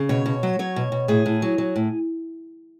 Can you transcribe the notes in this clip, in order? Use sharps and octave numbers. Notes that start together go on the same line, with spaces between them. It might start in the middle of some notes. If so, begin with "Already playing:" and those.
Already playing: C#3
B2 C#5
B2
F#3
F#3 C#5
B2
B2
A2 G#4
A2
F#3
F#3
A2